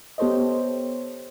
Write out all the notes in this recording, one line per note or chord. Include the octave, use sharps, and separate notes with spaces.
B3 G4 A4 C5 C#5 D#5